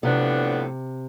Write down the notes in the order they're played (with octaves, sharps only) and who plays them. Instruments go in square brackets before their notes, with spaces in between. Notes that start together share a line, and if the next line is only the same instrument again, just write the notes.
[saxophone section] A2 F3 B3 D4 [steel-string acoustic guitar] C3